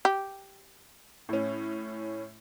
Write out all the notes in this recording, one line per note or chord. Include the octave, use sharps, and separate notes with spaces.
G4
A2 C#4